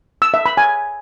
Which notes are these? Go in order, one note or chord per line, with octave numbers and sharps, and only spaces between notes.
E6
E5
B5
G#5